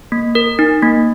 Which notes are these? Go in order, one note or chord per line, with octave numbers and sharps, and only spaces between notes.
A#3
A#4
D#4
A#3